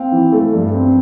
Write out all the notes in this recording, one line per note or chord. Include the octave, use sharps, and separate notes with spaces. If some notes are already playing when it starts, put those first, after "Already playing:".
Already playing: C4 F5 G5
E3
A3
G2
C4